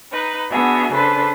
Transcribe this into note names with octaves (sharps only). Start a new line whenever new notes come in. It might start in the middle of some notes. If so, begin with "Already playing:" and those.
D#4 B4
B3 D4 F#4 G#4 E5
C#3 D4 A4 B4 C5